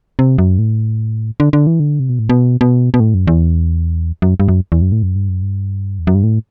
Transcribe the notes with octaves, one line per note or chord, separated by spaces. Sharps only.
C3
F#2
A2
D3
D3
E3
D3
C3
B2
A2
B2
B2
B2
A2
F#2
E2
F#2
G2
F#2
E2
F#2
A2
F#2
G2
F#2
G2
E2
F#2
G2
A2